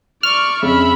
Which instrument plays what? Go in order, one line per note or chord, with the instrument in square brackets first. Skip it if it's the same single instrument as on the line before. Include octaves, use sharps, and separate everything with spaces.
[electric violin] D5 C#6 [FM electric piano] F6
[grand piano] F2 G#4 [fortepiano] C#3 [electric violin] E5 B5